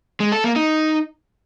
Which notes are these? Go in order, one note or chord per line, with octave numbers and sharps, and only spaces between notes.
G#3
A4
A#3
D#4